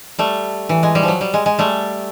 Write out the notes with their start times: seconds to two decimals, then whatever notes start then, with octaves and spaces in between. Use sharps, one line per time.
0.19 G3 A3
0.69 E3
0.83 G#3
0.95 G3
1.03 F3
1.08 F#3
1.21 G3
1.34 G#3
1.46 G#3
1.59 G3 A3